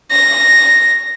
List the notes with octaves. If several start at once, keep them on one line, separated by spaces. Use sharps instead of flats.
A#6